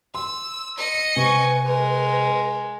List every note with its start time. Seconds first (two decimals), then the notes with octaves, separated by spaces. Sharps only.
0.15 C6 E6
0.78 D#5 C#7
1.16 C3 B4 G#5 C#6
1.66 G#3 A#4